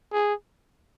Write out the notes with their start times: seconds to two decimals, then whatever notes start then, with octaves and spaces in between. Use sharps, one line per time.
0.13 G#4